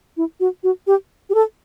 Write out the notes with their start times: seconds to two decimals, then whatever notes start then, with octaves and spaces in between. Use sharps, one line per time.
0.17 E4
0.40 F#4
0.63 F#4
0.87 G4
1.30 G4
1.35 A4